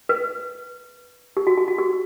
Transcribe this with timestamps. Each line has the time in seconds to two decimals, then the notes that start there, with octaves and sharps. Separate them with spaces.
0.09 B4
1.37 G4
1.47 F#4
1.58 F#4
1.68 F#4
1.78 G4